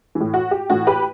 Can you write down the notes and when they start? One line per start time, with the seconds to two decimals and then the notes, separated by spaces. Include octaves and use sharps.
0.15 A2 E3
0.34 F#4
0.51 G4
0.70 A2 E3 F#4
0.87 G4 B4